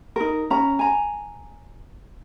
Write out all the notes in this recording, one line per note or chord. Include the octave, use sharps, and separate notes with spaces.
D#4 A#4
C#4 A#5
G#5 A#5